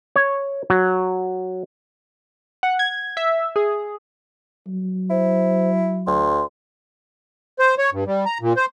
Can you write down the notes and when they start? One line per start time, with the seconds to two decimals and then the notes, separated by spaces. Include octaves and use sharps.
0.16 C#5
0.70 F#3
2.63 F#5
2.79 G#6
3.17 E5
3.56 G#4
4.67 F#3
5.10 E4 C5
6.07 D2 C6
7.59 C5
7.78 C#5
7.93 G2
8.07 G3
8.26 A#5
8.41 A#2
8.57 C5